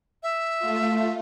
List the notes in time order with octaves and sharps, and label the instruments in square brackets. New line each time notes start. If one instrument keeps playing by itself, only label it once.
[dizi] E5
[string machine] A3 F4